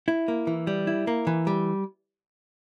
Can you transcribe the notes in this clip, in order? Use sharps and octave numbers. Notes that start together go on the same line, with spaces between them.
E4
A#3
E3
G3
E4
A#3
E3
G3